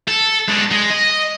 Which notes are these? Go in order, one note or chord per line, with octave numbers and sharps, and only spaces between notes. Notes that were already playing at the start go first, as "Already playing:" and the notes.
A4
G#3 D4
G#3
D#5